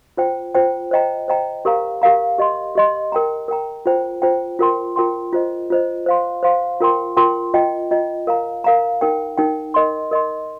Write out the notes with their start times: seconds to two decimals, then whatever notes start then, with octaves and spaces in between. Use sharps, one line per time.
0.17 F4 C5 G5
0.55 F4 C5 G5
0.91 C5 D#5 G5 A#5
1.28 C5 D#5 G5 A#5
1.65 G4 A#4 F5 A#5
2.02 G4 A#4 F5 A#5
2.39 G4 D#5 C6
2.75 G4 D#5 C6
3.12 A#4 G5 A#5
3.48 A#4 G5 A#5
3.86 F4 C5 G5
4.22 F4 C5 G5
4.59 F4 A#4 G5 C6
4.96 F4 A#4 G5 C6
5.33 F4 C5 D#5
5.70 F4 C5 D#5
6.06 C5 F5 C6
6.43 C5 F5 C6
6.80 F4 A#4 G5 C6
7.17 F4 A#4 G5 C6
7.54 F4 D#5 G5
7.91 F4 D#5 G5
8.27 A#4 F5 A#5
8.64 A#4 F5 A#5
9.01 D#4 A#4 G5
9.37 D#4 A#4 G5
9.74 A#4 D#5 C6
10.11 A#4 D#5 C6